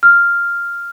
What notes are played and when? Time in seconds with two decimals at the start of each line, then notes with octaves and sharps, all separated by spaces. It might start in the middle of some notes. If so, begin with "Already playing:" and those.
0.03 F6